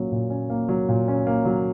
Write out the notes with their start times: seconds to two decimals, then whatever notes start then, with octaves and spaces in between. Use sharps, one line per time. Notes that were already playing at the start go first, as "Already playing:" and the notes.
Already playing: A#2 F#3 A#3 C#4
0.12 A#2
0.30 C#4
0.50 A#3
0.69 F#3
0.89 A#2
1.08 C#4
1.27 A#3
1.45 F#3